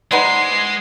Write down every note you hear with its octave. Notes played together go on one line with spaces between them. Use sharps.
G#3 D#4 B4 C5 D5 F#5 B5 C7